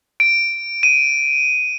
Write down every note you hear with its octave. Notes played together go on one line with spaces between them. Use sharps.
D7
D#7